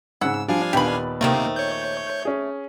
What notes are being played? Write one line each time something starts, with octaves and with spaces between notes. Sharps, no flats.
G#2 C#3 F#5 E6
F3 G3 D4 F5 G#5
D#2 A#2 B3 G4 B5
C3 D#3 F3 A3 A#3
C#5 G6
C#4 G#4